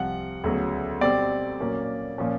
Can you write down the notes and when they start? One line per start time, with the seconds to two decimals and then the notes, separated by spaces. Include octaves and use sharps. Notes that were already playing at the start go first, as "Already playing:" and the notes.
Already playing: C2 C3 F3 F#5
0.44 D2 C#3 F#3 B3
1.01 B2 G3 C4 D5
1.60 A#2 F#3 A#3 C#4
2.18 A#2 F3 A#3 C#4